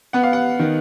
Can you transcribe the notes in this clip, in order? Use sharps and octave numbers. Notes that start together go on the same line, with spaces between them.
B3 F#5
F5
F#5
D#3